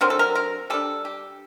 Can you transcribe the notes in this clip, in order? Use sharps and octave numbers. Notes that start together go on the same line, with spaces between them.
D3 F#3 C4 A#4
A4
A#4
A#4
G3 D4 A4
G4